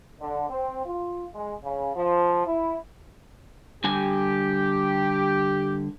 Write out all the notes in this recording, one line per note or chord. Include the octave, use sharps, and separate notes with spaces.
D3
C4
F4
G#3
C#3
F3
E4
D3 G3 G4 G#5